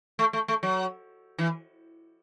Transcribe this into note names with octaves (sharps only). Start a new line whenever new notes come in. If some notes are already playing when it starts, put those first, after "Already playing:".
A3
A3
A3
F#3
E3